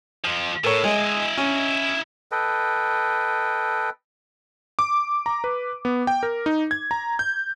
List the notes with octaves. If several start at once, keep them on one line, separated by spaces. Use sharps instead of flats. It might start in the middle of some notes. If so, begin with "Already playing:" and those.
F2 F3
A2 A4 A#4 C#5
G#3 E4 D#5
C#4
A4 B4 D#5 G5
D6
A#5
B4
B3
G5
A#4
D#4
G#6
A#5
G6